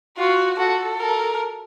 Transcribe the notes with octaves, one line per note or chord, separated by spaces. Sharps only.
F4 F#4
F#4 A4
A4 A#4